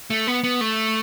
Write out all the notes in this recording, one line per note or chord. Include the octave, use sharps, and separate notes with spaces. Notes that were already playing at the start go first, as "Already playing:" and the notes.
A3
B3
B3
A3